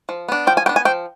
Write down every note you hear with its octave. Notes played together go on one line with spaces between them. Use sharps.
F3
B3 D4
F3 G5
G#5
B3 D4 G5
G#5
F3 G5